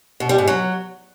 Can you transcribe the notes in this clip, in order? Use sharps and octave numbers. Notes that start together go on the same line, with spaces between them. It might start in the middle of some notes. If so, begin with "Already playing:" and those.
B2
G3
G#2
F#3